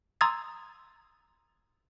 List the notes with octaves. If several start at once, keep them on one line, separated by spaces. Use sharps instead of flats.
A#5 C6 D#6 E6 G#6 A6